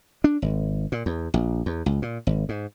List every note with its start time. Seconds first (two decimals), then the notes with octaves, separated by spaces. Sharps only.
0.24 D4
0.42 G#1
0.92 A#2
1.06 E2
1.34 A#1
1.66 E2
1.86 C#2
2.02 A#2
2.27 G#1
2.49 G#2